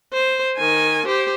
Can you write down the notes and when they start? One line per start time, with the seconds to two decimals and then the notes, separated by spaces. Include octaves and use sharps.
0.13 C5
0.57 D#3 G#5
1.06 G4 C5